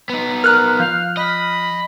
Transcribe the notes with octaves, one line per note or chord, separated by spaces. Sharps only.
B3 D#4
A#4 A#5 F6 F#6
F3 F5 G6
D#5 B5